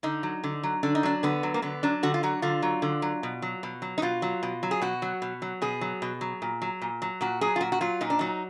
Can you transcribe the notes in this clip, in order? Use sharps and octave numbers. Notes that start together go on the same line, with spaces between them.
D3 D#4
F#3
D3
F#3
D3 D4
D#4
F#3 D4
D3 B3
F#3
A#3
D3 B3
F#3 D4
D3 F#4
F4
F#3 F#4
D3 F4
F#3
D3
F#3
B2
F#3
B2
F#3
D#4
B2 F4
F#3
B2
F#3
G#4
B2 F#4
F#3
B2
F#3
B2 G#4
F#3
B2
F#3
A#2
F#3
A#2
F#3
A#2 F#4
F#3 G#4
F4
A#2 F#4
F#4
F#3 F4
A#2 D#4
D4
F#3 D#4